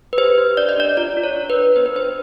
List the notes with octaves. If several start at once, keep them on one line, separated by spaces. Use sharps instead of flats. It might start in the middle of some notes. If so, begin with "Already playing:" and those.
B4
G4 C5
G4
D4 D5
D#5
D4 D5
F4 D5
F4
C#5
D4
B4
D4
B3 C5
B4
D4 C5